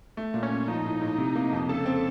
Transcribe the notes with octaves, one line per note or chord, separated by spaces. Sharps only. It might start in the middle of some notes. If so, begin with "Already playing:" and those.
A3
A#2
C#4
A#2
F3 D#4
A2
A2
C3
A#3
F2
C#3 A4
C4